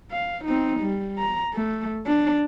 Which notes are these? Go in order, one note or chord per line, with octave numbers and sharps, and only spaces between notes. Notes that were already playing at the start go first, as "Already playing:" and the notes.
F5
C4 D#4
G3
A#5
A3
D4